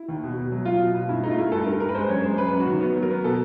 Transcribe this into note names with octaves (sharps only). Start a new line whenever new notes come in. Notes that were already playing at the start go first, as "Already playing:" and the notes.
Already playing: E4
D#2
B2
B2
F#3
F#3 F4
B2
B2 F4
G2 E4
A3 D#4
F4
A3 E4
G2 A4
G2 A#4
G2 A#4
B4
G#3 C5
F#2 C#5
G#3 C5
F#2 B4
F#2
F#4
D#3
B3
F#3
A#4
B3
B2 A4